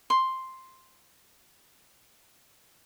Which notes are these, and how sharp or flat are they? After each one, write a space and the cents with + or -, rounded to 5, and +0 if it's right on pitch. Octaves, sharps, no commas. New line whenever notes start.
C6 +0